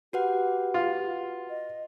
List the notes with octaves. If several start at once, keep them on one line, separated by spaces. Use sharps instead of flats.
F#4 G4 B4 F#5
F4
D#5